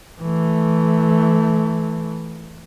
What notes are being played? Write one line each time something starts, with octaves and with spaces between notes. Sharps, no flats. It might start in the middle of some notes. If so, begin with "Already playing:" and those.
E3 A3